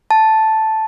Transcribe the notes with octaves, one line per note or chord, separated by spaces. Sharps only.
A5